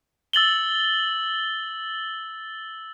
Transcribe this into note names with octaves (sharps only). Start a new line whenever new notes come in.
E6 A6 F#7 G7